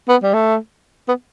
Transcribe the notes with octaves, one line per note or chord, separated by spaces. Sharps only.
B3
G3
A3
B3